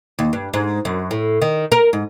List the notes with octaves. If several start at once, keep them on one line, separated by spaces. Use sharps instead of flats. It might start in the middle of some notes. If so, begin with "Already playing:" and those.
D#2
G2
G#2
F#2
A2
D#3
A#4
G#2